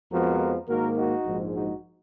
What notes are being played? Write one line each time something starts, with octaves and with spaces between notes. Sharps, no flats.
F2 F3 G#3 B3 F#4 A#4
G#2 D#3 A#3 F#4 A#4
D#4 F#4
A#1 G#2 F3 G#3
D#4 F#4